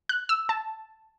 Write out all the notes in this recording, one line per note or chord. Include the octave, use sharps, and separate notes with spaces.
F#6
E6
A5